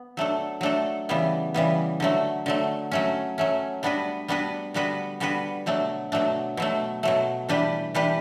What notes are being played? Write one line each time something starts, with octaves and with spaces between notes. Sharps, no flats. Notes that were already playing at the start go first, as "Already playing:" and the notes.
Already playing: B3
F#3 A3 D4 A4
F#3 A3 D4 A4
C#3 E3 G3 B3
C#3 E3 G3 B3
D3 F#3 A3
D3 F#3 A3
F#3 A3 C#4
F#3 A3 C#4
G3 B3 D4 F#4 B4
G3 B3 D4 F#4 B4
D3 G3 B3 F#4 B4
D3 G3 B3 F#4 B4
B2 F#3 A3 D4
B2 F#3 A3 D4
B2 F#3 A3
B2 F#3 A3
E3 G3 D4 G4 B4
E3 G3 D4 G4 B4